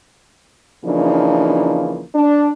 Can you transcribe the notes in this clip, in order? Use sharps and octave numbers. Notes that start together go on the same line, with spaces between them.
C#3 E3 F3 A#3 D4 D#4
D4